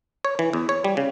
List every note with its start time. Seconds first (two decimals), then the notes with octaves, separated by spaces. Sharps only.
0.25 C#5
0.39 E3
0.53 E2
0.69 C#5
0.84 G3
0.97 C#3